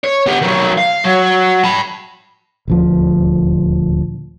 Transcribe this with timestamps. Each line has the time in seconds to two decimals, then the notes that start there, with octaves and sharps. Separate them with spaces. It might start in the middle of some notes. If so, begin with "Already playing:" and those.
0.04 C#5
0.26 B3 G4
0.41 D#3 F#3
0.78 F5
1.05 F#3
1.64 A5 B5
2.68 D#1 D2 F3